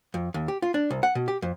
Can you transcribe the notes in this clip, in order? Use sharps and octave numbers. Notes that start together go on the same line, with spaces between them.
F2
D#2
G4
F4
D4
C2
F#5
B2
G4
F2